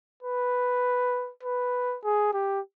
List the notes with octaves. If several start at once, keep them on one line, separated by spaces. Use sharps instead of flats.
B4
B4
G#4
G4